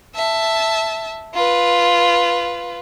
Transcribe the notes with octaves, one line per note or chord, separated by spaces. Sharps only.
E5 A5
F4 B4